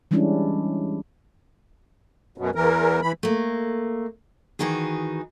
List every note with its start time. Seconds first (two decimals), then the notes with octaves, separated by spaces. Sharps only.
0.11 E3 G3 G#3 C#4 D4 E4
2.38 F#2 B2
2.55 E2 E3 A#4
3.02 E3 B5
3.23 A3 A#3
4.59 D#3 E3 D#4 F#4 G#4